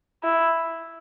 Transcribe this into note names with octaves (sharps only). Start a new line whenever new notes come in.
E4